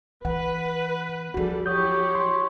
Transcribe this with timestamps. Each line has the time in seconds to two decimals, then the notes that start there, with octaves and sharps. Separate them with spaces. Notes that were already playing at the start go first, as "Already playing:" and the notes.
0.25 E3 B4 F#5
1.34 E2 F3 G3 D4 F#4 G#4 A4
1.66 F#3 E4 G4 C#5 D#6 G6
2.15 C6